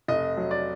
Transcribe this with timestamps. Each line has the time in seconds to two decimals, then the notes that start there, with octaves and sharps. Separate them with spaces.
0.08 F1 D#5
0.37 F#3
0.51 D5